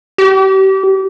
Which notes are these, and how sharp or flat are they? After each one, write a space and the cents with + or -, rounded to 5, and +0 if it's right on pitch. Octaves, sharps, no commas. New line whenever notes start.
G4 -30